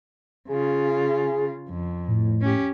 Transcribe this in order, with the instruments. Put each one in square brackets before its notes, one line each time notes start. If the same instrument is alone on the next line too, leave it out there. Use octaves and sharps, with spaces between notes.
[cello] C#3 F4 [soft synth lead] G#4
[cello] F2
[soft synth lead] A2
[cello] C#4 G4